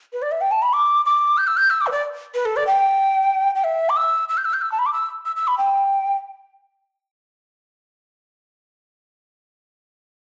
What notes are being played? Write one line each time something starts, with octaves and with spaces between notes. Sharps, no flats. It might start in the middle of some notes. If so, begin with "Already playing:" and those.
B4
D5
E5
G5
A5
B5
D6
D6
G6
E6
G6
E6
D6
B4
D5
B4
A4
D5
G5
G5
E5
D6
E6
E6
G6
E6
G6
E6
A5
B5
D6
E6
E6
E6
B5
G5